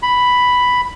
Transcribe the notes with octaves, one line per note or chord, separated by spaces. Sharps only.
B5